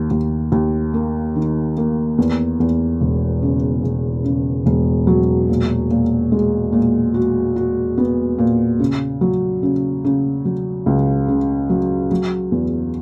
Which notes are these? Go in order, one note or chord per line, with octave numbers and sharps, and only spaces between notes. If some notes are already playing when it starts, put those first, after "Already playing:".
Already playing: D#2 A#3
D#2
D#2
A#3
D#3
A#3
E2
E2
E1
C#3
E1
C#3
E1
F#3
A#2
A#2
G#3
A#2
F#4
F#4
B3
A#2
C#3
F#3
C#3
C#3
F#3
C#2
C#3
F#3
F#3
E2